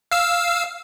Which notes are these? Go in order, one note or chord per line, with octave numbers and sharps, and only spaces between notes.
F5 E6